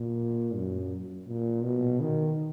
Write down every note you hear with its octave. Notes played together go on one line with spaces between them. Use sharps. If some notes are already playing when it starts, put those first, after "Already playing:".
Already playing: A#2
F#2
A#2
B2
D#3